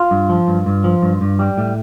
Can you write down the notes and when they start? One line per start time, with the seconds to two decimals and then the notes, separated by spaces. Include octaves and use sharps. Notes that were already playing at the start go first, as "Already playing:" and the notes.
Already playing: F4
0.11 G2
0.29 F3
0.48 G2
0.66 G2
0.84 F3
1.03 G2
1.21 G2
1.39 G3
1.58 A2